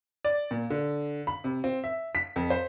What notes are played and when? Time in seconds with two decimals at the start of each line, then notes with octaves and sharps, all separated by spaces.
0.25 D5
0.51 A#2
0.70 D3
1.27 B5
1.44 C3
1.64 C4
1.84 E5
2.15 B6
2.36 F2
2.50 C5